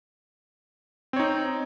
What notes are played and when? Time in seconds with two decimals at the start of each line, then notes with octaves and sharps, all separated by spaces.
1.13 C4
1.16 C#5
1.20 D#4